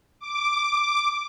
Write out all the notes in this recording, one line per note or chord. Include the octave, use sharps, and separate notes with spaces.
D6